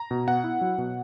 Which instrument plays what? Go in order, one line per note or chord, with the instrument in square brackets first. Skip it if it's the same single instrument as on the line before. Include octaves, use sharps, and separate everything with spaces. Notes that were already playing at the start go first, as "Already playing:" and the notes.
Already playing: [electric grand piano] A#5
B2
B3 F#5
E4
F#3
B2